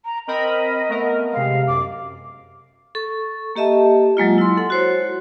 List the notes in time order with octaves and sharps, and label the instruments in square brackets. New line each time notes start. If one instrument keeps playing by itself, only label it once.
[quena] A#5
[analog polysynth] C4 A#4 B5 [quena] D#5
[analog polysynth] A3 B3 A#4
[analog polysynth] C3 G#3 [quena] F5
[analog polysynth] F#2 [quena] D6
[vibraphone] A4 C#6
A#3 G4 D#5 E5 A5
F#3 G#3 A#3 F4
E4 C6
A4 F#5
F#4 C5 C#5